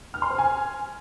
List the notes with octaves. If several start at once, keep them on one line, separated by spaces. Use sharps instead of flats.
F6
C6
C5
G#5